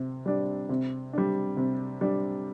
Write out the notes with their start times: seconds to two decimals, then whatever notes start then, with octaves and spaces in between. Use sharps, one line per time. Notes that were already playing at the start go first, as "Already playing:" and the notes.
Already playing: C3
0.26 G3 D4
0.69 C3
1.13 G3 D4
1.57 C3
2.01 G3 D4